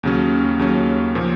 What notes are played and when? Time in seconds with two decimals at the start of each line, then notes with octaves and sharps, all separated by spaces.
0.03 D#2 C#3 F#3 C#4
0.59 D#2 C#3 F#3 C#4
1.15 A#2 F3